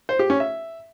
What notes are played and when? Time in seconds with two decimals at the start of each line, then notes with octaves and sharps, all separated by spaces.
0.09 C5
0.19 G4
0.30 C#4
0.40 E5